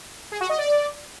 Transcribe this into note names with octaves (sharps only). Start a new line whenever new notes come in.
G#4
F#4
D#5
D5